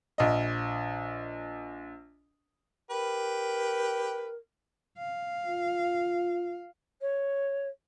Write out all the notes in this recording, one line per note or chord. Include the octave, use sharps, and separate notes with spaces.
A#1 D#5
G4 A#4 B4
F5
F4
C#5